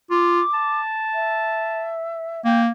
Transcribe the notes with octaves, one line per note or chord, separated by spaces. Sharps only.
F4 D6
A5
E5
A#3 G5